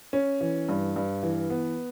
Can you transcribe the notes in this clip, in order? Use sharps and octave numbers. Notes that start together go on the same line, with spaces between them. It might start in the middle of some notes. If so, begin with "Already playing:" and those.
C#4
E3
G2
G2
E3
B3